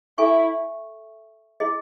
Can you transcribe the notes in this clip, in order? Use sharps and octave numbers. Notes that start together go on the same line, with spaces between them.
E4 A4 E5 G#5 C#6
E4 G#4 D#5